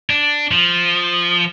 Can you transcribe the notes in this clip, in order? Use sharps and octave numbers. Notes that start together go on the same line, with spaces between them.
D4
F3